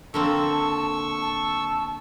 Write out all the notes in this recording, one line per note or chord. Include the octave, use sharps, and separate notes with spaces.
D3 A#3 C4 A5 C#6 E6
A5